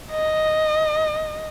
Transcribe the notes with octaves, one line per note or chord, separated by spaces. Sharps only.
D#5